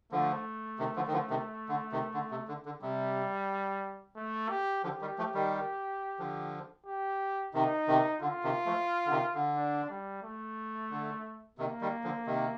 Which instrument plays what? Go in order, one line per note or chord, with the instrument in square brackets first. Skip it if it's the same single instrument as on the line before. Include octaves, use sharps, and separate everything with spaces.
[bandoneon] D3 F3 [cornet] A3
[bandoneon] C3 D#3
D3 F3
D#3
D3 F3
C3 D#3
D3
C3 D#3
D3
C3
D3
D3
[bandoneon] C3 [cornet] G3
[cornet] A3
G4
[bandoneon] D3 F3 [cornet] G4
[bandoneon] D#3 G3
F3 A3
D#3 G3
D3 F3
[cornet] G4
[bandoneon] C3 D#3 [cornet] D#4
[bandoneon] C3 D#3
[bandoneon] D3 [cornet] F4
[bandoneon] C3 D#3
F3 A3
D3
C3 D#3
D3
[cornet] D4
G3
A3
[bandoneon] D3
[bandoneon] C3 D#3 [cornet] A#3
[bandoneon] D#3 G3
D3 F3
C3 D#3